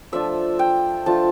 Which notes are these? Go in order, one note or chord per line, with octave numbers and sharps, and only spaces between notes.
F3 A3 D4 F4 E5
G5
F3 A3 D4 F4 A5